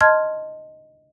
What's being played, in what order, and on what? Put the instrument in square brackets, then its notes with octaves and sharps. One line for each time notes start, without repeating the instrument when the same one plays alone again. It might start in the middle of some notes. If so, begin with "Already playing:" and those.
[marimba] D#5 A5 C6 F6 G#6